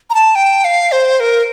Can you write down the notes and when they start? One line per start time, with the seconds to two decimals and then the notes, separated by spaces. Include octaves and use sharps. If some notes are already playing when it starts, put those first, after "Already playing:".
0.10 A#5
0.14 A5
0.35 G5
0.64 F5
0.92 C5
1.20 A#4